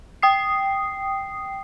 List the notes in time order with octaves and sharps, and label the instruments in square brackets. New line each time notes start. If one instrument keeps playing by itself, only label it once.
[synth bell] G5 D#6 C7